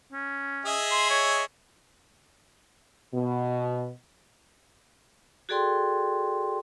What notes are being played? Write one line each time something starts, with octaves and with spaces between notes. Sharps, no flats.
C#4
G#4 D#5 E5
C6
C#5
B2
F#4 G#4 A4 D5 G5 C6